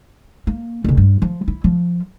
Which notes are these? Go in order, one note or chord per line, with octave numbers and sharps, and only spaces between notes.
A#3
F#1 C3
G2
F3
E4
F3